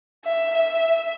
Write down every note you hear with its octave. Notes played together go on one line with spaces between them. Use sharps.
E5
E5